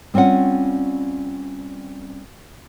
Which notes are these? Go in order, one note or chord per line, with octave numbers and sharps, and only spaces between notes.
G3 C4 C#4 F4 F#5